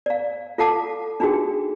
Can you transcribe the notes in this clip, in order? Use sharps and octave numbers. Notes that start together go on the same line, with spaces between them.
D5 F5
F4 A4 F5 F#5 A5 D6
D4 D#4 F4 F#4 G#4 G5